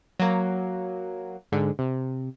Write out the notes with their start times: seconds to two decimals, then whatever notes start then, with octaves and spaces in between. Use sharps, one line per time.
0.19 F#3 A#3
1.52 G#2 D3
1.79 C3